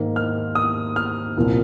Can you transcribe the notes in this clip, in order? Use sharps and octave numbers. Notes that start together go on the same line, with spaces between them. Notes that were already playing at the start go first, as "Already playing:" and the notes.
Already playing: G#2 D#3 A#3
F6
D#6
F6
C2 A#2 F3 A#3